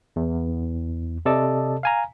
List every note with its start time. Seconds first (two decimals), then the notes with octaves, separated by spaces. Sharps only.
0.16 E2
1.26 C3 A4 D5 D#5 A5
1.83 F5 G#5 A#5